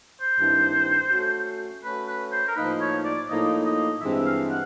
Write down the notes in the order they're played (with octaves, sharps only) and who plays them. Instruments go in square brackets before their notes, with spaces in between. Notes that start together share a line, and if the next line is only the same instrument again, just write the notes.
[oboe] C5
[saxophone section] G2 D#3 G3 C4 E4
A3 C#4 F#4
[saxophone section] A3 C#4 F#4 [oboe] B4
[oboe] B4
C5
A#4
[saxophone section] A2 F3 A#3 D#4 [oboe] B4
[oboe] C#5
D5
[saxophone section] A2 F3 A#3 D#4 [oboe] D#5
[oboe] D#5
[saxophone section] G2 E3 G#3 C4 [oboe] E5
[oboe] F5
F#5